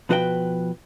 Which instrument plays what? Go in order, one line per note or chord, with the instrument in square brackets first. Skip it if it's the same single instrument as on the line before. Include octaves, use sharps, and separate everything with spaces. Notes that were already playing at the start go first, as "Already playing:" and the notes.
[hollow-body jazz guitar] B2 F3 F#4 B4 D#5 G5